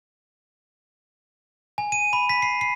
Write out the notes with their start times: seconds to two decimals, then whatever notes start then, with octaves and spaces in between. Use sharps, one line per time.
1.78 G#5
1.92 D#7
2.13 B5
2.29 B6
2.42 C7
2.61 C7